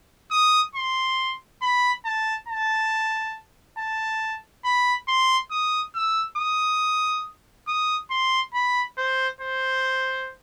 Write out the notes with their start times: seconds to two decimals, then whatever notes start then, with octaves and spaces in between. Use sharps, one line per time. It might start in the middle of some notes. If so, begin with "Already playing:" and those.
0.32 D#6
0.75 C6
1.62 B5
2.05 A5
2.48 A5
3.78 A5
4.65 B5
5.08 C6
5.51 D#6
5.95 E6
6.38 D#6
7.68 D#6
8.11 C6
8.54 B5
8.98 C5
9.41 C5